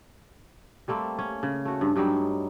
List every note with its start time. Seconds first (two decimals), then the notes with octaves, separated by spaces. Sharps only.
0.88 G3 A3 A#3 C4
1.19 C#4
1.43 C#3
1.65 A3 F#4
1.81 G2
1.96 G2 F#3 G3 D#4